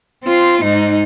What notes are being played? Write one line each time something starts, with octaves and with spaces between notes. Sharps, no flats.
C4 F4
G#2 D#4